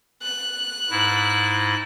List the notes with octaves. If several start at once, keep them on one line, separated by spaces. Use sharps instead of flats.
F#6
G#2 E4